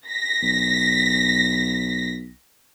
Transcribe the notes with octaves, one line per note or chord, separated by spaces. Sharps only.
A#6 B6
B1